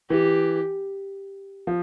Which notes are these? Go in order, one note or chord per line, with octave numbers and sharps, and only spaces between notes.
E3 G4
F3